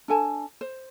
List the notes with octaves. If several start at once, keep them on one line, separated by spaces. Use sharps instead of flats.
D4 A4 G#5 A5
C5